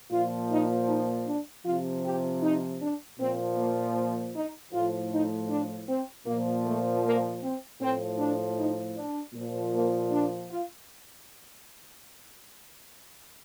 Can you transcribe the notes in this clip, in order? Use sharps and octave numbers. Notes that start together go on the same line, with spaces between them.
A#2 F3 F4
D#4
D#4
D4
C3 F3 F4
G4
D#4
D4
A#2 F3 C4
A#3
D#4
A2 F3 F4
D#4
D4
C4
A#2 F3 A#3
A3
A#3
C4
A2 F3 C4
D4
D#4
D4
A#2 F3
A#3
D4
F4